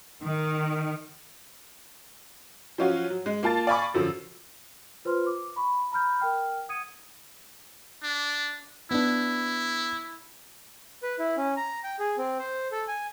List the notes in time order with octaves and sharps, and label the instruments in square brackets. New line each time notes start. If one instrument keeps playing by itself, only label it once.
[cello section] D#3
[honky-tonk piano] F3 F#3 C#4 F4 F#4
F#3
G#3
A#3 F4 A5 A6
D5 F5 G#5 B5 C#6 D6
F#2 D3 F3
[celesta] F4 B4 C5 C6 F6
D6
B5 C#6
A#5 B5 F6 G6
A#4 G5 F6
F#5 D#6 G#6 C#7 D#7
[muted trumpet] D4
[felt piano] B3 D4 [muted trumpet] E4
[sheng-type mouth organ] B4
E4
C#4
A#5
G5
G#4
C4
C5
A4
G#5